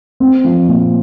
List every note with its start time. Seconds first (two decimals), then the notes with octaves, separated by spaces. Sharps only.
0.20 C4
0.44 F3
0.68 A#2